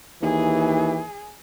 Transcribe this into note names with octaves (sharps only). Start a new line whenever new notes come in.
D#2 E3 G#4